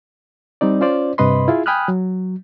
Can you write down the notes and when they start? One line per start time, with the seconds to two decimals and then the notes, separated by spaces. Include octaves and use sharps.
0.61 G3 C4 D#4 D5
0.81 C#4 F4 C5 D5
1.18 G2 C3 B4 D#5 B5 C6
1.48 E4 F4 G#4
1.66 G5 G#5 B5 D#6 F6 F#6
1.88 F#3